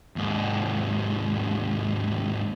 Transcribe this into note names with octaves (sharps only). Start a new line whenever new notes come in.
D#2 G#2